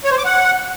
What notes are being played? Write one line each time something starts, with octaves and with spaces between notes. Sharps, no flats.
C#5
C5
D6
F#5